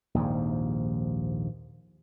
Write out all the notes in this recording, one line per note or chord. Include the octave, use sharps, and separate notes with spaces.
A#1 D#2 G#2 F3